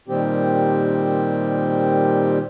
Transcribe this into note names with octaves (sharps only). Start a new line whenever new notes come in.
A#2 D#3 G3 C4 G4